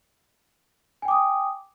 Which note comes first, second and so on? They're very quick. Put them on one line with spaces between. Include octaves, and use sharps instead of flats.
G#5 G5 D6 D#6